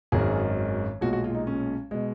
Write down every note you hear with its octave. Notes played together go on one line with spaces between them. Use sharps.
G#1 F#2 D#3 G#3 G#4
B1 A#2 G#3 F#4
F#4
F4
D#4
C#4
B2 G#3